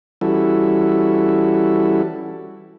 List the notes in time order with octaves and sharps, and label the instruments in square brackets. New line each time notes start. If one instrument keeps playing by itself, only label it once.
[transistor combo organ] E3 G3 C#4 E4 F#4 A4